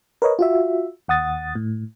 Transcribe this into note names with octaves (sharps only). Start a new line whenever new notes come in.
A#4 B4 C#5 D#5
F4 F#4 E5
D#2 F#5 D#6 A6
A2